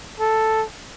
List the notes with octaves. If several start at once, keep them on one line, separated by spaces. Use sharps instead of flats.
A4